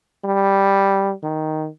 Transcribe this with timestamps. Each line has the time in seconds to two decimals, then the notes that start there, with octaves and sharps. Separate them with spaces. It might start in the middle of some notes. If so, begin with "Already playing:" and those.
0.24 G3
1.23 D#3